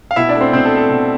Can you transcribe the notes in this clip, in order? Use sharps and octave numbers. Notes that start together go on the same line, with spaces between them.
F5
B2 E4 E5
D4 D5
A3
C4 C5
B2 C4 C5
A4
A3
A4
B2